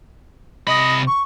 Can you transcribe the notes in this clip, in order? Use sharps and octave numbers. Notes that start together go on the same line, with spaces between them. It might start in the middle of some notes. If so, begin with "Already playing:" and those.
C3 D#5 B5
C#6